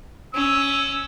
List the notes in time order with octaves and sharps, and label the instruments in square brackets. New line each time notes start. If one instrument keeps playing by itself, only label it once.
[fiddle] C#4 [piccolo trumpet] E6